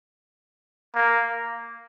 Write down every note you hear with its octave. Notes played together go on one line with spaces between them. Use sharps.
A#3